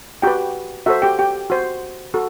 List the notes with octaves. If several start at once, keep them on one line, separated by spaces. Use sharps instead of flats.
F#4 G4 B4 G5
F#4 A4 C5 E5
G4 G5
G4 G5
F#4 C5
F#4 A4